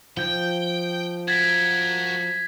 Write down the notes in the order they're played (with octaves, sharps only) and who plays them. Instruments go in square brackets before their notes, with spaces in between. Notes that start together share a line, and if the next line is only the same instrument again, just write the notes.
[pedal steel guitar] F3 G6 [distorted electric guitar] G5
[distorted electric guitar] F#4 A#4 [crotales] G#6 A6 B6